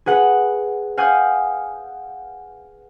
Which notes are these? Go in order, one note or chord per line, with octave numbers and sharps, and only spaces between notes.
G#4 B4 F#5
F5 F#5 G#5 D#6 G6